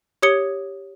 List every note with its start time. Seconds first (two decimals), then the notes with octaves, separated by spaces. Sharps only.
0.23 G4 C#5 D#6 G#6 C#7 G7